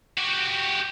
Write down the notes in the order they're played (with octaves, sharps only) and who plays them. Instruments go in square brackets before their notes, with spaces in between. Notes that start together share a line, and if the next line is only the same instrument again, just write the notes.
[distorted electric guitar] F#4 G4